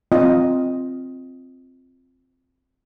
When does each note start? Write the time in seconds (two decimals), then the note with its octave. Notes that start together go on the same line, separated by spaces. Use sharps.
0.12 C4 F4 D#5